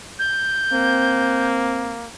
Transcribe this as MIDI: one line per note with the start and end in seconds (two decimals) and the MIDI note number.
0.19 1.47 91
0.72 2.08 58
0.72 1.98 60